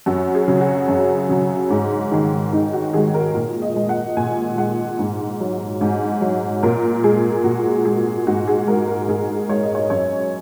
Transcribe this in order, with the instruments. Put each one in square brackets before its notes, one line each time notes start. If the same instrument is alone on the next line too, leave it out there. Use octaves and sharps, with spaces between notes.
[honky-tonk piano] F#2 F#4
G#4
C#3 F#3
F#4
F#2
C#3 F#3
G#2
D#3 G#3
G#2 D#4
F#4
D#3 G#3 G#4
A#4
A#2
D#5
G#3
F#5
A#2 G#5
G#3 F#5
G#2
F#3
G#2
F#3
A#2 A#4
G#3 G#4
A#2 F#4
G#3 G#4
G#2 F#4
G#4
G#3 A#4
A#4
G#2 G#4
G#3 C#5
D#5
C#5
F#2 C#5